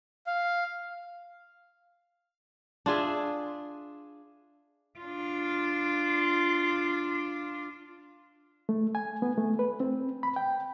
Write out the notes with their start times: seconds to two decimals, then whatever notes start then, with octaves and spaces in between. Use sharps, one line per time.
0.27 F5
2.86 D4 F4 G#4 E5
5.00 D4 F4
8.69 A3
8.95 G#5
9.22 B3
9.37 A3
9.59 B4
9.80 C4
10.23 B5
10.36 G5